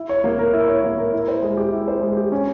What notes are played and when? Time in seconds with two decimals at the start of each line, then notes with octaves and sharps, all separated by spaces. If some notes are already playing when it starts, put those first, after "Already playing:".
Already playing: E4
0.09 C#5
0.24 A#3
0.39 A#4
0.53 E4
0.68 C#5
0.84 A#3
0.98 A#4
1.13 E4
1.28 C5
1.42 G#3
1.57 G4
1.72 E4
1.88 C5
2.02 G#3
2.17 G4
2.32 C#4